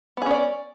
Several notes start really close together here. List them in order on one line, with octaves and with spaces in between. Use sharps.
B3 G#4 C#4 D5